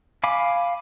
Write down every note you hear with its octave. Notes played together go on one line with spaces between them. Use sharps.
F5 G#5 B5 D6